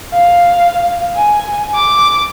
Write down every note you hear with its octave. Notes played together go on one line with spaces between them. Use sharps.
F5
G#5
D6